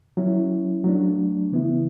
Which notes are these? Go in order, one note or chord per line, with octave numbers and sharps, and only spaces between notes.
F#3 C#4 E4
F#3 A3 D4
C#3 E3 B3 E4